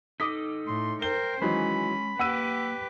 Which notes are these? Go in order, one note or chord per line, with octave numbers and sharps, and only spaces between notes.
D#4 A4 D#5 D6 D#6 B6
A2 C6
A#4 C5 G5 G7
D#3 E3 F#3 G#3 C#4 B5
A#3 G4 B4 F#5 G5 E6 D#7